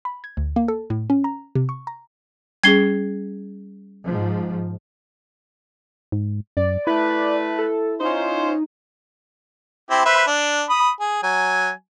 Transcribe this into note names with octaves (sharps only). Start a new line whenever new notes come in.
B5
G#6
D2
A#3
A4
A2
C#4
A#5
C3
C#6
A#5
G3 C#4 G#4 G#6 C7 G7
G#2 F3
G#2
F#2 D5
A3 E4 B4
A4
C#4 D#4 F4 C5
C4 E4 G4
B4 C5 E5
D4
B5 D#6
G#4
F#3 G#5